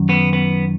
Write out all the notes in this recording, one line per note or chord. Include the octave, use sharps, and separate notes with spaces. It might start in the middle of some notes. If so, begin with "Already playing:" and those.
Already playing: F#2 D#3
B3
B3